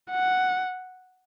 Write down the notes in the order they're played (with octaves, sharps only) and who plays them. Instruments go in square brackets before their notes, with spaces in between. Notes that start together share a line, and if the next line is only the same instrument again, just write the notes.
[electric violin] F#5